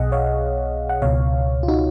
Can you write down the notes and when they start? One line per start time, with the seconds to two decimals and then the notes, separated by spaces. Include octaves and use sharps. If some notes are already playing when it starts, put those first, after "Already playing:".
Already playing: B1 B2 G#4 D#5 F#5
0.12 C#5 F5
0.89 F#5
1.02 C#2 B2 C#5 F5
1.63 F4
1.68 D#4 F#4